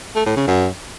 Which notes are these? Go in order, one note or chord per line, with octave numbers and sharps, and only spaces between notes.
A3
A2
C#3
F#2